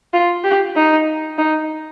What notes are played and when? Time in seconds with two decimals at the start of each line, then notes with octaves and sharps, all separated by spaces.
0.13 F4
0.44 G4
0.76 D#4
1.38 D#4